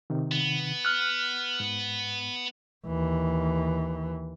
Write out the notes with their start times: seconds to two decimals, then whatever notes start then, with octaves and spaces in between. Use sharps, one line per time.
0.10 C3 D#3
0.32 B3
0.85 F6 F#6
1.60 G#2
2.87 D#2 E3